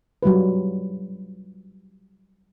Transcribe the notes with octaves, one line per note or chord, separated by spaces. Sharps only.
F#3 G3 F4 B4